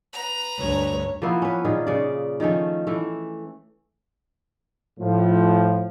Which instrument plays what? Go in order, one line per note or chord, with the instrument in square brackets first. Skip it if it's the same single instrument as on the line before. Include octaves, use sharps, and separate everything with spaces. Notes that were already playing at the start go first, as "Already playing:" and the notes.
[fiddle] B4 A#5
[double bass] D2 G2 [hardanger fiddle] C#5
[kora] F3 A#3 B3 E4
C#4 B4
A#2 D#3 F4 G#4
C#3 D5
D#3 F3 A3 C#4
E3 A3
[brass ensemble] A2 F3